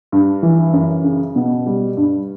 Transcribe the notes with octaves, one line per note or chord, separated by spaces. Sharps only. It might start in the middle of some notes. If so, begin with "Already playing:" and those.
G2
E3
F#2
C#3
B2
G3
G2